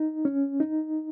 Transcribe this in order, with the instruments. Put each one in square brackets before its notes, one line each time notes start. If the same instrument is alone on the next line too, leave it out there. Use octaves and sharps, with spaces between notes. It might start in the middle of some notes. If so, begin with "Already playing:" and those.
Already playing: [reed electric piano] D#4
C#4
D#4